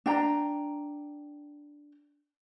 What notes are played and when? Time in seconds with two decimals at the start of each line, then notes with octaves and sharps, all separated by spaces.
0.06 D4 G5 A#5